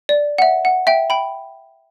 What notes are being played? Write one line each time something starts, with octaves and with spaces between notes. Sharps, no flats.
D5
F#5
E5
F#5
E5 G5
G5 B5